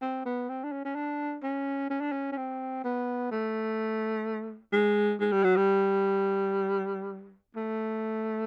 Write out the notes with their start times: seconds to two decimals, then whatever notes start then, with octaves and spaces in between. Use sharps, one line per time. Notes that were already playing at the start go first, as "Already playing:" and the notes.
0.01 C4
0.25 B3
0.49 C4
0.64 D4
0.72 C#4
0.85 C#4
0.95 D4
1.43 C#4
1.90 C#4
2.01 D4
2.12 C#4
2.32 C#4
2.37 C4
2.84 B3
3.31 A3
4.72 G#3
5.20 G#3
5.32 G3
5.44 F#3
5.57 G3
7.56 A3